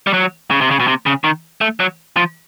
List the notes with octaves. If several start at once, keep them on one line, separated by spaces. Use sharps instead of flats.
G3
F#3
C#3
C3
C#3
B2
C3
C#3
D#3
A3
F#3
F3